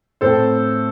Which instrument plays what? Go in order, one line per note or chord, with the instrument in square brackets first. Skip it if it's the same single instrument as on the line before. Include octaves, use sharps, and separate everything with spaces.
[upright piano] A2 A3 C4 A4 C5